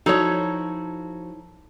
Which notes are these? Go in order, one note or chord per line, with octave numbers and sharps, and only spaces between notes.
F3 D#4 E4 F#4 A4 C#5 A5